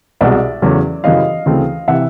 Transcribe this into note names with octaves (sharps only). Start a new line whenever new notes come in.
C2 B2 G#3 D5 E5
E2 C#3 F#3 A3 C#4
F#2 C#3 E3 G3 D#5 F5
D2 C#3 E3 A3 C4
C3 E3 E5 F#5